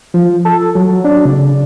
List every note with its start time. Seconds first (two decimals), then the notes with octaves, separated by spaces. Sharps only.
0.14 F3
0.45 A4
0.75 F#3
1.04 D4
1.25 C#3